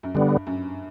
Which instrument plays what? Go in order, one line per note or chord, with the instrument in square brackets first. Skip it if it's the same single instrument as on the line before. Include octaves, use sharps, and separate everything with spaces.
[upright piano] F#2
[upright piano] G2 [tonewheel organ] D3 G3 B3
[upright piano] F#2